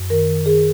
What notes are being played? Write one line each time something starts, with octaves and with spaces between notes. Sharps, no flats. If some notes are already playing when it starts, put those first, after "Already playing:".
Already playing: F#2
D#3 A#4
D#3
D#3 G#4